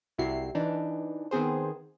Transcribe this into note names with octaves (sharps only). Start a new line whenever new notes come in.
C2 C3 E4 F#4 C7
E3 D4 D#4
D#3 B3 C4 G#4 C5